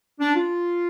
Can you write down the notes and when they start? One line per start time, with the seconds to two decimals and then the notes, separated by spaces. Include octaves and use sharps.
0.20 D4
0.35 F4